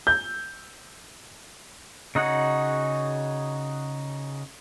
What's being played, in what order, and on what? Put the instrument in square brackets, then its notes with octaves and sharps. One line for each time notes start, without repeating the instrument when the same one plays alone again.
[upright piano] G6
[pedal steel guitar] C#3 D#4 F#4 G#4 F#5